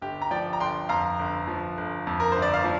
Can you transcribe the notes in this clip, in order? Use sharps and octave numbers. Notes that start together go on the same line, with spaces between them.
G1 G4
A#5
F3 D5 G5
A#5
G1 G5 C6
F2 F5 A#5
G1
F3
G1
F2
A#4
G1 C5
D5
F5
F3